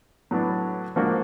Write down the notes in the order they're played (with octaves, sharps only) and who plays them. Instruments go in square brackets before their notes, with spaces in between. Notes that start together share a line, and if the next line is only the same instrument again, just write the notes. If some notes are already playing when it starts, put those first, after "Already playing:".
[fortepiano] A2 F#3 B3 D4
G#2 F3 A#3 D4 F#4